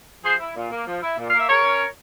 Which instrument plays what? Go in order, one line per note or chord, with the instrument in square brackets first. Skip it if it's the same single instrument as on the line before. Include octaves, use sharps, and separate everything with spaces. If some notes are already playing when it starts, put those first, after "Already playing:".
[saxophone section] F3 G#4 C5
E4
A#2
A#3
F3
E4
A#2
A#3 F5
E5
C#3 A#4 C#5
C#4